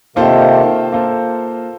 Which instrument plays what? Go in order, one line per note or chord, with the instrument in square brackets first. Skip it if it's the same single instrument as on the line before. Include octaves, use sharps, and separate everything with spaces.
[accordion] C3 D#3 [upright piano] A#3 F4 A4 C5
[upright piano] A#3 F4 A4 C5